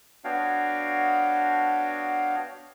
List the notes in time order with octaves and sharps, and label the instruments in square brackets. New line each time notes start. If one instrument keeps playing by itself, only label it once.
[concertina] B3 D4 F#4 C#5 F5 G5